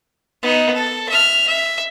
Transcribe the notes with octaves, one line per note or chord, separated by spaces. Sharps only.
B3 D#4
A4
E5 F6
E5